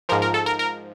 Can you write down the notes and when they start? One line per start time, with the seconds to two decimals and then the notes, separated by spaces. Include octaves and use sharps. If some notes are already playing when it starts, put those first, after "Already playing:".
0.09 G#2 F3 A#4
0.22 A#4
0.34 A4
0.46 A#4
0.59 A#4